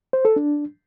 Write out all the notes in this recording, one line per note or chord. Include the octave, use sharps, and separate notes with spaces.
C5
A4
D4